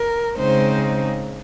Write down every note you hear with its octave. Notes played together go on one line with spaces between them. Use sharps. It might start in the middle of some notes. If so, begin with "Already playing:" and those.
Already playing: A#4
C#3 G#3 C4 D#4 C5